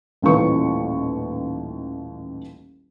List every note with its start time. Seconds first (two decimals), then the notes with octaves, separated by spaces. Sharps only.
0.22 D#1 A1 D#2 E3 B4 C#6